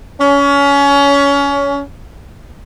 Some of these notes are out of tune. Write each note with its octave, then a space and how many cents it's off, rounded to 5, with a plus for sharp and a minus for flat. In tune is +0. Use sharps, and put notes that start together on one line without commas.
C#4 +25